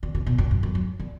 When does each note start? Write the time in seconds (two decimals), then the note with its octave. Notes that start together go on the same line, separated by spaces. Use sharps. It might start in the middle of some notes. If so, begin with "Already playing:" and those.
0.03 D3
0.15 C#3
0.26 B2
0.38 G2
0.51 F#2
0.63 F#2
0.75 F#2
1.00 D3